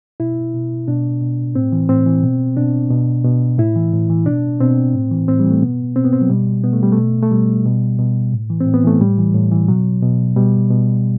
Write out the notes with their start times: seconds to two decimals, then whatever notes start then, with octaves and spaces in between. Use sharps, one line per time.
0.20 B2 E4
0.54 B2
0.88 B2 D4
1.21 B2
1.55 A2 C4
1.72 E3
1.89 A2 C4
2.06 E3
2.23 B2
2.57 B2 D4
2.91 B2
3.24 B2
3.59 A2 E4
3.76 E3
3.92 A2
4.10 E3
4.26 B2 D4
4.60 B2 C4
4.94 A2
5.11 E3
5.28 A2 C4
5.39 G3
5.45 E3
5.51 A3
5.62 B2 B3
5.96 B2 C4
6.05 B3
6.13 C4
6.21 F#3
6.30 B2 G3
6.64 B2 B3
6.73 A3
6.83 G3
6.92 A3
6.97 B2
7.23 A3
7.31 B2 G3
7.65 B2
7.99 B2
8.33 A2
8.50 E3
8.60 C4
8.67 A2
8.74 B3
8.84 E3 A3
9.01 A2 G3
9.18 E3
9.35 A2
9.51 E3
9.68 B2 F#3
10.02 B2
10.36 B2 G3
10.71 B2